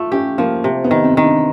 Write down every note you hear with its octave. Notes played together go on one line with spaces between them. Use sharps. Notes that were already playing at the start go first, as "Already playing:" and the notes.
Already playing: A3 F4
C#4 G4
F3 A#3
C3
B3
D#3
C4
D#3
D4